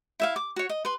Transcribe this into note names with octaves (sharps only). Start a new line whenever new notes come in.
E4 E5 F5
D6
F#4 C#5
D#5
B4 C6